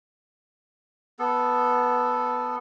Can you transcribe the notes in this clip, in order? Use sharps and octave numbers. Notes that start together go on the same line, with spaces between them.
B3 A4